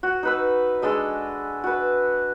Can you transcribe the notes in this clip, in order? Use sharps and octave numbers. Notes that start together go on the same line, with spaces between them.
F#4
D#4 B4 E6
G#3 D4 A4 D#5
F#4 B4